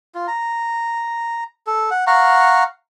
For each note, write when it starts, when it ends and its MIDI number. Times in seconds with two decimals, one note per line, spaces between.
0.15 0.27 65
0.28 1.44 82
1.67 1.90 69
1.91 2.04 78
2.07 2.64 77
2.07 2.64 78
2.07 2.64 82
2.07 2.64 85